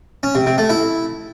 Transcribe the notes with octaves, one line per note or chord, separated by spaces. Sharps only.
C#4
C3
C3
A3
E4